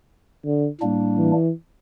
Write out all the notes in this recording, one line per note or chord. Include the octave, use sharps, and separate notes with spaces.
D3
A2 G3 A#3 D4
E3